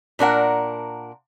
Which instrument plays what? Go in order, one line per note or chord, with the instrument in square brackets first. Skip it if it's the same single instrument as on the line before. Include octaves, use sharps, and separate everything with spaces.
[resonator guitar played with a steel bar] A#2 D4 A#4 F#5